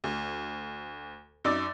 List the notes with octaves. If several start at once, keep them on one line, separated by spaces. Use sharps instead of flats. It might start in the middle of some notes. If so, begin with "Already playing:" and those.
D2
F#2 D#4 D5 D6 E6 A6